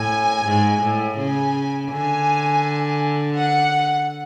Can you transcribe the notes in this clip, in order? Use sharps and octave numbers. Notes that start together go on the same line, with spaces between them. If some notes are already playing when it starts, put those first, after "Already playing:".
Already playing: A2 G#5
G#2
A2
C#3 G#5
D3 G#5
F#5